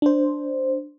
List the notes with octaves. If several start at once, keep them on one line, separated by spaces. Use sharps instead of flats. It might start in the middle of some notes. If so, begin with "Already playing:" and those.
D4 C5